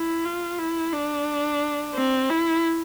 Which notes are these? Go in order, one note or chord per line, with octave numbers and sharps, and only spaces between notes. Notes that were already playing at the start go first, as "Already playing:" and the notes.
Already playing: E4
F4
E4
D4
C4
E4